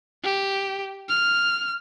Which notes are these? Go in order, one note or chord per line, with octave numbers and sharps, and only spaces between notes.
G4
F6